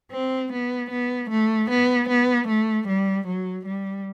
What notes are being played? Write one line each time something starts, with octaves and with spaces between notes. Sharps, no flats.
C4
B3
B3
A3
B3
B3
A3
G3
F#3
G3